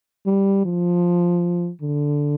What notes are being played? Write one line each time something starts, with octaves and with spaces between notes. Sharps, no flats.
G3
F3
D3